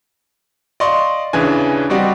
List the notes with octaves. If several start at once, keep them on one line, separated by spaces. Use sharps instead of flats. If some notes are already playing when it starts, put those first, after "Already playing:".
D5 D#5 F5 C6 C#6
D#2 C#3 E3 D4 G#5
G3 C4 F#4 G4 D5 D#5